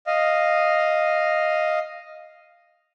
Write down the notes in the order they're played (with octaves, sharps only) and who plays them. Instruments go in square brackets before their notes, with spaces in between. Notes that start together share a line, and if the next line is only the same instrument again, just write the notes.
[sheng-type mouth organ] D#5 F5